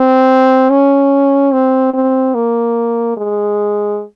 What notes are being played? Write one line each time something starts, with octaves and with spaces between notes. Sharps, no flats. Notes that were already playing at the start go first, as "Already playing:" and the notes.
Already playing: C4
C#4
C4
C4
A#3
G#3